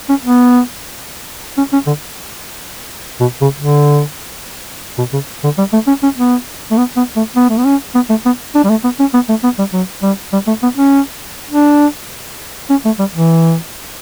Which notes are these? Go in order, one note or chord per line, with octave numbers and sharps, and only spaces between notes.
C#4
B3
C#4
C#4
D3
B2
C#3
D3
B2
C#3
D3
G3
A3
C#4
C#4
B3
A3
B3
B3
A3
B3
A3
B3
C#4
B3
A3
B3
D4
G3
A3
B3
C#4
B3
A3
B3
G3
F#3
G3
G3
A3
B3
C#4
D4
C#4
A3
G3
E3